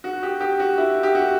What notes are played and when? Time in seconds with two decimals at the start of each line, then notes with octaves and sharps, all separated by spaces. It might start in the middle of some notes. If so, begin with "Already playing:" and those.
0.04 F#4
0.23 G4
0.41 G4
0.60 F#4
0.78 E4
1.03 G4
1.15 F#4